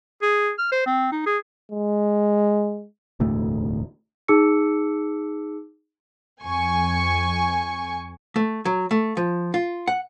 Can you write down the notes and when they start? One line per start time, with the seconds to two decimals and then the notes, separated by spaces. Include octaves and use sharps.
0.22 G#4
0.59 F6
0.72 C5
0.86 C4
1.12 D#4
1.26 G#4
1.72 G#3
3.20 E1 D2 A2 A3
4.28 D#4 G#4 A5 D6 E6 C#7
6.42 F2 G#5 C#6
8.36 A3
8.65 F#3
8.91 A3
9.17 F3
9.54 F4
9.87 F#5